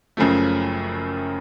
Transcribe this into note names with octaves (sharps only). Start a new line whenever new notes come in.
F#1 F#2 C#3 F3 A3